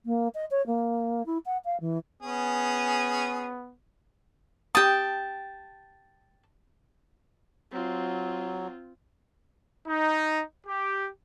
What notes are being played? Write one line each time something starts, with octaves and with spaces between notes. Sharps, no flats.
A#3
D#5
C#5
A#3
E4
F#5
F5
E3
B3 C#4 G#4
G4 G5 A5 D#6
F#3 C4 F4
D#4
G4